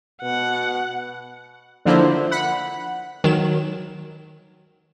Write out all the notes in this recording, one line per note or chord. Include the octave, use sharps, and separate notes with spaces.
B2 F#5
D3 F3 A#3 D4 E4 C5
F#5 B5
D#3 F#3 E7